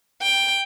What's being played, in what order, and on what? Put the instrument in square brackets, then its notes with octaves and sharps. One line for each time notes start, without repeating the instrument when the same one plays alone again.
[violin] G5